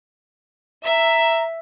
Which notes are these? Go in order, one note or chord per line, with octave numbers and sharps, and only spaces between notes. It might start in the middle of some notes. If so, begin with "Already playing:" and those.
E5 A#5